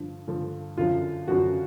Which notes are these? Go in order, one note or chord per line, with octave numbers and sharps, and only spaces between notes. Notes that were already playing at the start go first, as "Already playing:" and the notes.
Already playing: G2 D3 F3
G2 D3 F3
F#2 D3 F3 F4
F#2 D3 F3 F#4